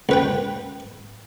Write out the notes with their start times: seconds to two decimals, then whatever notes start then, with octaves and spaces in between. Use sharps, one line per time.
0.09 C#2 B4 G5